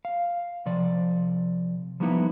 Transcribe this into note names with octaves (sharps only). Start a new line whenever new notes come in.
F5
C3 F3 D5
F3 G3 A#3 B3 D#4 E4